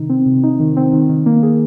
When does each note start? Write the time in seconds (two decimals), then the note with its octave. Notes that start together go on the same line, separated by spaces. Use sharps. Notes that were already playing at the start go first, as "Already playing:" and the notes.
Already playing: C3 D#3 D#4
0.09 C4
0.26 C3
0.43 D#4
0.60 D#3
0.77 C4
0.93 D#3
1.09 D#3
1.26 A#3
1.43 G#4